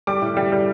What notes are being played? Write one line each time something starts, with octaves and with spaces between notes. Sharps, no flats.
G3 D6
A2
G3
G3